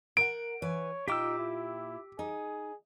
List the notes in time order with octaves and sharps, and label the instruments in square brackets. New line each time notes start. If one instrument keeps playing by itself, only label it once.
[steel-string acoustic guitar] A#4 F#5 [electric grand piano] D7
[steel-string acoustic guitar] E3 B4 G#5 [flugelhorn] C#5
[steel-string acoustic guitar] A#2 F4 G5 [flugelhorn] D#4 [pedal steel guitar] G4 D6 E6
[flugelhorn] E4
[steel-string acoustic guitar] D#4 [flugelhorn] G#4